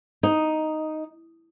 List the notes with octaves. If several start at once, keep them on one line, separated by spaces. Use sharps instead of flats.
D#4